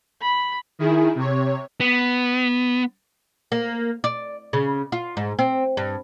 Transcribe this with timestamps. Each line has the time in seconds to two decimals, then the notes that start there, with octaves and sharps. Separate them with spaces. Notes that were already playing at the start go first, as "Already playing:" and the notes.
0.22 B5
0.79 D#3 E4 G#4
1.15 C3 C#5
1.80 B3
3.52 A#3
4.04 D5
4.53 C#3
4.92 F4
5.17 G#2
5.39 C4
5.77 G2